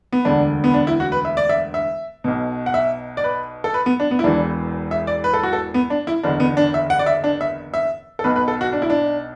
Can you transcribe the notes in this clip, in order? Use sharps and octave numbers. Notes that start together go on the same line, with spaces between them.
B3
E1 D2 D3 D4
B3
D4
E4
F#4
B4
E5
D5
E5
E5
B1 B2
F#5
E5
D5
B4
A4
B4
B3
D4
B3
E4
E1 E2 E3 D4
E5
D5
B4
A4
F#4
A4
B3
D4
E4
F#1 E2 D3 D4
B3
D4
E5
F#5
D5
E5
D4
E5
E5
A4
B1 B2 B4
B4
A4
F#4
D4
E4
D4